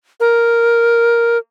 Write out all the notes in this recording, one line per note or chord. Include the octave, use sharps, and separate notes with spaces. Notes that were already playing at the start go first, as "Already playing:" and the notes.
A#4